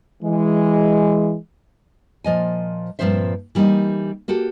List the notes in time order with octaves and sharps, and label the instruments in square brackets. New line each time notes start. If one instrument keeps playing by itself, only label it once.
[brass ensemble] E3 G#3
[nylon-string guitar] A#2 F3 D#5 G#5
G2 A#2 F3 C4 C5 E5
E3 G3 A#3 D4 D#4
A#3 F#4 G4 A4